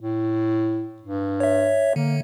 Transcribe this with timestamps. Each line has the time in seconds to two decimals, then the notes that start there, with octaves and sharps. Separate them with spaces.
0.01 A2
1.02 G2
1.40 C#5 E5
1.96 D3 A#3